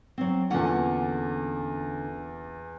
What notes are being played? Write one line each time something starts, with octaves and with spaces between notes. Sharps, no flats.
F#3 C4
E2 A#2 D3 C#4 F#5